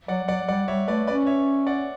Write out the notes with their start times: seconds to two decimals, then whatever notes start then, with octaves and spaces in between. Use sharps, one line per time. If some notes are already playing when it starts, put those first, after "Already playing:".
0.08 F#3 D5 F#5
0.28 F#3 D5 F#5
0.48 G3 D5 F#5
0.67 G3 C#5 E5
0.88 A3 B4 D5
1.07 C#4 B4 D5
1.27 C#5 E5
1.67 D5 F#5